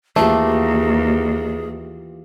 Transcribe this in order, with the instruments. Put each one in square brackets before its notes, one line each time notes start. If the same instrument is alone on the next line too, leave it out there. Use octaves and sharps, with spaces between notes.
[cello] D#2 [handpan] E3 F4 G4 [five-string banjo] A3 [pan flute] G#4